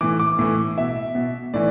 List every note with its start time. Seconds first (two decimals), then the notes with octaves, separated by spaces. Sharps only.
0.01 A2 E3 D6
0.20 D6
0.39 A2 E3
0.77 B2 E5
1.15 B2
1.54 A2 E3 D5